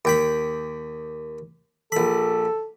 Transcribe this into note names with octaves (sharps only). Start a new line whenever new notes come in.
D#2 G5 B5
A#1 A4 B5